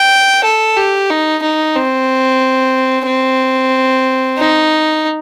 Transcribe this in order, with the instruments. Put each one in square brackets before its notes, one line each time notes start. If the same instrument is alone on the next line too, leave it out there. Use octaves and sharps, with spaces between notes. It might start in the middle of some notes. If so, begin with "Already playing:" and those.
Already playing: [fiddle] G5
A4
G4
D#4
D#4
C4
C4
D#4